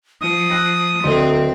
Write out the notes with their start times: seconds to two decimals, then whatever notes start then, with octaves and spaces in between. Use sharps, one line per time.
0.21 F3 D#6
0.50 E6 F#6 A#6
1.04 D1 D2 C4 A4 D5 D#5 C6